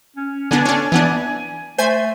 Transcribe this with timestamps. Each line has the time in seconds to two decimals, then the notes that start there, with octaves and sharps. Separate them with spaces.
0.16 C#4
0.51 D3 B3 D4 G#5
0.65 C#4 D4
0.92 E3 B3 D4
1.78 A3 C5 G#5